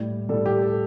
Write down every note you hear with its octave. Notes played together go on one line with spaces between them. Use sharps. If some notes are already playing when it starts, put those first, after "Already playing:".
Already playing: A2 G3
A2 G3 A4
G4
A4